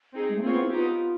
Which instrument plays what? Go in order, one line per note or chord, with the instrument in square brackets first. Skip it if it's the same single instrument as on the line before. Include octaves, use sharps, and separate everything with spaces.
[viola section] C4 D#4 G#4
[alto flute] G#3
A3
[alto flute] A#3 [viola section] C4 F4 G#4 C#5
[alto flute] B3
E4
[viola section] B3 D#4 G4 [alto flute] F4